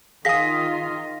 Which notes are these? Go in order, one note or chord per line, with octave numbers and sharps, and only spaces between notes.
D#3 F4 G#4 F5 D#6 A#6 B6